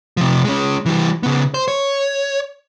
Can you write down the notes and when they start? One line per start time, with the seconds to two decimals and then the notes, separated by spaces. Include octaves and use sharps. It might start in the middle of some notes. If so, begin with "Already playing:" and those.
0.17 C3 F3
0.44 G#3 C#4
0.86 E3 G3
1.23 C#3 B3
1.54 C5
1.68 C#5